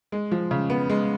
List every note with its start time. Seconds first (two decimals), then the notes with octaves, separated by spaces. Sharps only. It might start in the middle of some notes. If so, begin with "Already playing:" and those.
0.12 G#3
0.31 F3
0.51 C#3
0.70 B3
0.90 G#3